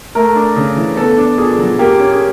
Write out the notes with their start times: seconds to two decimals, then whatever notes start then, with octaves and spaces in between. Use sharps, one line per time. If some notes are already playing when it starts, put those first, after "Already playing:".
0.15 A3 A#4
0.36 D4
0.56 C#3
0.77 E3
0.97 B3 A4
1.18 D4
1.38 A#2 G#4
1.59 F#3
1.79 A#3 G4
1.99 C#4
2.11 G#4